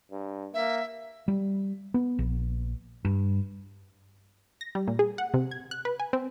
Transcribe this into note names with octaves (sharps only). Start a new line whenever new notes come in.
G2
A#3 E5
G3
B3
A#1
G2
A#6
G3
A#2
G#4
F#5
C3
G#6
F#6
B4
G#5
C4